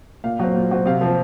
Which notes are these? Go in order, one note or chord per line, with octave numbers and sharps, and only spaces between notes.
A#2 F5
F#3 C4
A#2
F#3 C4
C3 F5
F3 C4